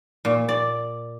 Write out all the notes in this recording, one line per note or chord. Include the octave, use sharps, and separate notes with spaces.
A#2
D5